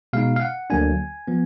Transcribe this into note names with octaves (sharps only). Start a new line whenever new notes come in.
B2 G#3 D#4 F5
F5
F#5
D2 D3 F#3 A#3 D4 G#5
F3 B3